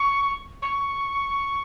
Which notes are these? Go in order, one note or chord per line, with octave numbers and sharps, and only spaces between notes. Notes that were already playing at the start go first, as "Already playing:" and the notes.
Already playing: C#6
C#6